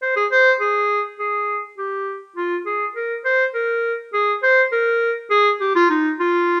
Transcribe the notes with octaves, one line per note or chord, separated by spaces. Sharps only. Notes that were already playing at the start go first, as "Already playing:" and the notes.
C5
G#4
C5
G#4
G#4
G4
F4
G#4
A#4
C5
A#4
G#4
C5
A#4
G#4
G4
F4
D#4
F4